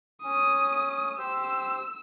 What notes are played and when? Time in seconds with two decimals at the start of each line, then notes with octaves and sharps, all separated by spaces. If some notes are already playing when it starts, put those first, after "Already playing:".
0.24 C#4 D#6
1.18 G4 C5 E6